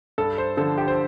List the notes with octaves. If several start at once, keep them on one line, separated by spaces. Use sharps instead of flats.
G2 A4
C5
D3 F3 A4
G4
C5